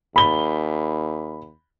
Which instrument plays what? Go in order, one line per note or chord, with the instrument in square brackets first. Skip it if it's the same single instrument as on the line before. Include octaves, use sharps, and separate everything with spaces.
[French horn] D#2 [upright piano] B5 G7